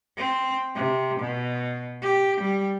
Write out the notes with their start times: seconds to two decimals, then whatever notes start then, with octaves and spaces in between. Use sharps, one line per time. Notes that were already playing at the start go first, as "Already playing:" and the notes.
0.17 C4
0.75 C3
1.20 B2
2.02 G4
2.41 G3